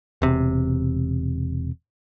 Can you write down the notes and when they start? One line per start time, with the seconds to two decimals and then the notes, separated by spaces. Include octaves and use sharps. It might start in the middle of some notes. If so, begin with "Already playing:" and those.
0.22 E1 C3